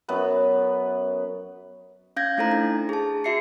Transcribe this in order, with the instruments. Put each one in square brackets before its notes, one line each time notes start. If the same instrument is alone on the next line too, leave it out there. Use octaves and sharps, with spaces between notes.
[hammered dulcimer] F#2 B3 B4
[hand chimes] C#4 F5 G6 G#6 A#6
A3 D#4 E4 A4 C5 A#5
D4
G#4 A5
F#4 G#4 E5 C7 C#7